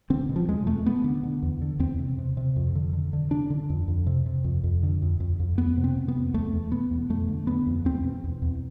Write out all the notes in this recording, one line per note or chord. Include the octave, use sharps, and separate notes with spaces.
D3 C4
B2
F3
E2 G#3
E2 A3
B2 B3
D3
D3
E2
D3
E2 C4
C3
C3
C3
F2
D3
D3
D3
D3 D4
D3
F2
F2
C3
C3
F2
F2
D3
F2
F2
F2
F2 B3
C3
C4
C3
B3
F2
E2 A3
E2
B2 B3
E2
F2 A3
D3
D3 B3
F2
E2 C4
B2
E2
E2